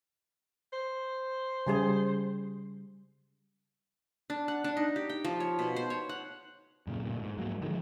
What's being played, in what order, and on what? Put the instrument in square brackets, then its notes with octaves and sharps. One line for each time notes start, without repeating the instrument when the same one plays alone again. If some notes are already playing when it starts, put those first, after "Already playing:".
[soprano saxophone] C5
[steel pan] C#3 G3 G#4
[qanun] D4
F#5
D4
D#4
G4
G5
F3
C#5
B2
C5
C#5
F#5
[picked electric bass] F#2 A#2 C#3
D2 A#2
G#2
G#2 F#3 A#3
D3 D#3 F3 G#3